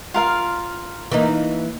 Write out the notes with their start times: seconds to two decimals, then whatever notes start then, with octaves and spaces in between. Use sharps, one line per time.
0.14 F4 A#4 F5
1.11 E3 A#3 D#4